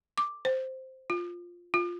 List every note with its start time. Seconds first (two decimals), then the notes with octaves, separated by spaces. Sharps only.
0.18 D6
0.45 C5
1.10 F4
1.74 F4